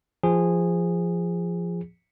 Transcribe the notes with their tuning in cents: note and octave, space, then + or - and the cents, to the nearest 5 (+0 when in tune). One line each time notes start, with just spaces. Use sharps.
F3 -15 G#4 -15